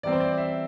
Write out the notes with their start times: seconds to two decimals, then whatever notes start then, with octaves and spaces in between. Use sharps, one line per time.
0.03 E3 G3 C4 D5
0.12 C5
0.20 D5
0.38 E5